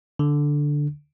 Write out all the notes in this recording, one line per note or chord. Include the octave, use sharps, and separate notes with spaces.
D3